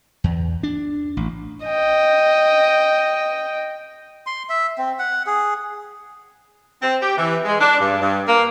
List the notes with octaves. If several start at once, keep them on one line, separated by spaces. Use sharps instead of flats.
E2
D4
A1
D#5 G5
C6
E5
C4
F#5
G#4
C4
G4
E3
G#3
D4
G2
G2
A#3